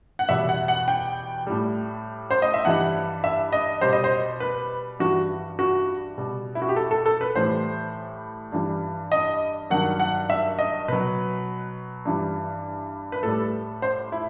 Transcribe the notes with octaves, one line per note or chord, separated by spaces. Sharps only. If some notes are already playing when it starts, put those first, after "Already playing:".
F#5
E2 B2 G3 E5
F#5
F#5
G5
A2 G3
C5
D#5
E5
G2 E3 G3 F#5
E5
D#5
B2 G3 C5
D#5
C5
B4
G2 E3 G3 F#4
F#4
B2 G3
E4
F#4
G4
A4
A4
A4
B4
A2 E3 G3 C5
G2 E3 G3
D#5
G2 D#3 F#3 F#5
F#5
E5
D#5
B2 F#3 B4
G2 E3 G3
B4
A2 G3 A4
C5
E4